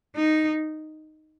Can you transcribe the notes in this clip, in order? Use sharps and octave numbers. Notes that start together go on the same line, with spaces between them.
D#4